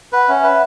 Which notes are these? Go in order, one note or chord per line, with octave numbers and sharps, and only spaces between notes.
B4 F#5
C#4 E5
B4 E5